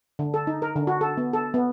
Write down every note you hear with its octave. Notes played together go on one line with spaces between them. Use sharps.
D3
A4
D#4
A#4
D3
F#4
A4
B3
A4
B3